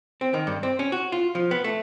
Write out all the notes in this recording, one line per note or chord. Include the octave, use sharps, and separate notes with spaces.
C4
D#3
G2
C4
C#4
F#4
F4
F3
B3
A3